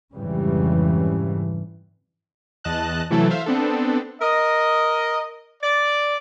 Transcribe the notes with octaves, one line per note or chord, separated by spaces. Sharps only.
F2 G#2 C#3 E3 G3
E2 D#5 A5 F#6
C3 E3 F#3 A3 E4 A4
C5 E5 F5
B3 C4 D4 A4
A#4 D#5
D5